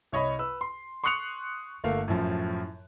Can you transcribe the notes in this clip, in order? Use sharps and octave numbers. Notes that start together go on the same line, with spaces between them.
C2 C#5 D#5 B5
B4 E6
C6
C6 C#6 D#6 F#6 C#7 F7
G1 A3 A#3 F5
F#2 A2 F3